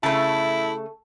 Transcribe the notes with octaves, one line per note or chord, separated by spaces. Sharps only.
C#3 A3 E4 A5